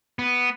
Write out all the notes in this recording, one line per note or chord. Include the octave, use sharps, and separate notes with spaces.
B3